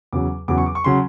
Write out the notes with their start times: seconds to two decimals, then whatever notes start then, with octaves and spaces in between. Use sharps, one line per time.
0.13 E2 C#3 F#3 D6
0.48 E2 C#3 F#3 D6
0.58 C#6
0.66 D6
0.75 C#6
0.84 C#3 F#3 C6